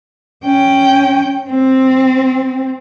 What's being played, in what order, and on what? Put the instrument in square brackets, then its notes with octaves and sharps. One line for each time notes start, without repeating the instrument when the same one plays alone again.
[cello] C#4 G5
C4